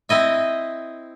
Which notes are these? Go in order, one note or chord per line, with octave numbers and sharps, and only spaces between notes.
C4 E4 D#5 E5